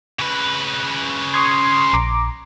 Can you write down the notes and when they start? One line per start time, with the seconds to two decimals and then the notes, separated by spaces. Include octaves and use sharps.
0.19 C#3 B4
1.34 C6 C#6 D#6 G#6
1.93 A#1 A#5 D6